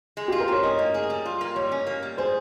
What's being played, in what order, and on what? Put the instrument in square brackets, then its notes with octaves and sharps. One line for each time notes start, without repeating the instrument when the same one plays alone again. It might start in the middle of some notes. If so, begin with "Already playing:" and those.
[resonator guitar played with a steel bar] G#3
[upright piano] G4
[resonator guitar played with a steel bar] F4
[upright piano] A#4
[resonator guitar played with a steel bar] C4 [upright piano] C#5
[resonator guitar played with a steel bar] C#4 [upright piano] D#5
[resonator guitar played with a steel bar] A#3
G#4
G3
F4
A#3
[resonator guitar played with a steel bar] G3 [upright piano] C#5
[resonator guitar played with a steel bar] C#4
A#3
G3
[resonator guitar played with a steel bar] G#4 [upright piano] C5